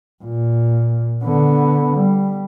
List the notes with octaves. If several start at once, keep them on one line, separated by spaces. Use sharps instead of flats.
A#2
D3 B3
G3